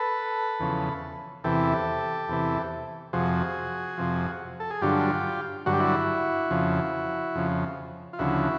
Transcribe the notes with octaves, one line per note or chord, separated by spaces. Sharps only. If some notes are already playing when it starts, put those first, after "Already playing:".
Already playing: A4 B4
E2 C#3 F3
E2 C3 E3 G4 A4
E2 C3 E3
F2 C3 F3 F#4 G#4
F2 C3 F3
A4
G#4
G2 D3 F#3 F4 G4
G2 D3 F#3 F#4
G4
E4 F#4
F2 C#3 F3
F2 C#3 F3
F4
D2 C#3 F3 E4 F#4